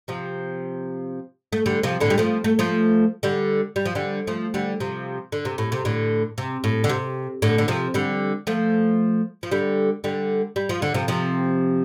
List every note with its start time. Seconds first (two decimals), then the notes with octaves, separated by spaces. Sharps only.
0.08 C3 F3
1.53 A3
1.66 D3 G3
1.83 C3 F3
2.00 A2 D3
2.10 G3
2.18 F3 A3
2.44 A3
2.59 F3 A3
3.23 D3 G3
3.76 G3
3.86 F3
3.95 D3 G3
4.27 F3 A3
4.54 D3 G3
4.80 C3 F3
5.32 D3
5.45 C3
5.58 A2
5.72 C3
5.85 A2 D3
6.38 C3
6.64 A2
6.84 D3
6.89 C3
7.42 A2 D3
7.58 D3
7.68 C3 F3
7.94 D3 G3
8.47 F3 A3
9.43 F3
9.51 D3 G3
10.04 D3 G3
10.56 G3
10.69 F3
10.82 D3
10.94 C3 F3
11.08 C3 F3